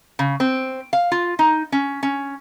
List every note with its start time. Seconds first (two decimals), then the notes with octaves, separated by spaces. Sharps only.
0.19 C#3
0.40 C4
0.93 F5
1.12 F4
1.39 D#4
1.72 C#4
2.03 C#4